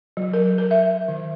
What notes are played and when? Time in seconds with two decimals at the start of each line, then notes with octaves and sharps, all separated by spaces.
0.17 F#3
0.34 A#4
0.58 A#4
0.71 E5
1.08 D#3